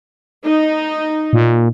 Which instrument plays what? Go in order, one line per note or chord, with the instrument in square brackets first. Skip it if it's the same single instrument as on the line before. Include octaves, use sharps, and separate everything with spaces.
[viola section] D#4
[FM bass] A#2